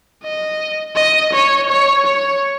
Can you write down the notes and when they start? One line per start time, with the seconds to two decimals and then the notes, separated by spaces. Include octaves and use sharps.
0.24 D#5
0.96 D#5
1.33 C#5
1.70 C#5
2.06 C#5